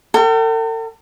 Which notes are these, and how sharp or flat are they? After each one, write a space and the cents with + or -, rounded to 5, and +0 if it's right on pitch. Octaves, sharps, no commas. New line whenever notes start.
A4 +45 G5 -40